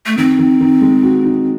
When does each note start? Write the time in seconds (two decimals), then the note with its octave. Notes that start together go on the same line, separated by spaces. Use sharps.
0.06 A3
0.17 D#3 C4
0.39 D#3
0.61 D#3
0.82 G#3
1.03 F#4
1.24 D#4